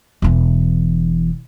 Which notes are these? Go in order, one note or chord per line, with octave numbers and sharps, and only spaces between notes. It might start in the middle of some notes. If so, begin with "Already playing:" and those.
E1 E3